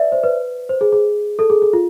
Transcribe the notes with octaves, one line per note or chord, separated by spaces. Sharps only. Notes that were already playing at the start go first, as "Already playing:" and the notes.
Already playing: B4 D5 E5
C5
B4
C5
G#4
G#4
A4
G#4
G#4
F4